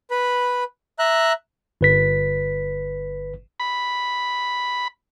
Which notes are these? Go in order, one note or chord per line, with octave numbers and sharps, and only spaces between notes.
B4 B5
E5 A#5 F#6
G1 B4 B6
B5